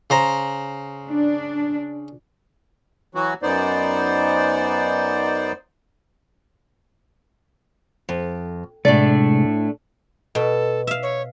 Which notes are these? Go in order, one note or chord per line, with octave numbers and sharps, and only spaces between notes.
C#3 C5 A#5
D4
E3 F#3 F#4
F#2 B3 D#4 C5 D5
F2
A2 C3 G#3 A3 D4 D5
B2 A4
E5 F5
C#5